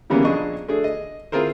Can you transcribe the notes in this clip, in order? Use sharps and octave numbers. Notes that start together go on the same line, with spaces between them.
C#3 E3 G3 A#3 B3 C#4
A#1 D4 G#4 D#5 C#6
A3 D4 G#4
D#5
C4 E4 F4 G#4 A#4 C5